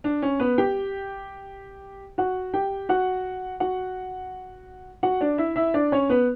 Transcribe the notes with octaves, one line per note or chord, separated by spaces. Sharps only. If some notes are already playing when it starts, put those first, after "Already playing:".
D4
C#4
B3 B4
G4 G5
F#4 F#5
G4 G5
F#4 F#5
F#4 F#5
F#4 F#5
D4 D5
E4 E5
E4 E5
D4 D5
C#4 C#5
B3 B4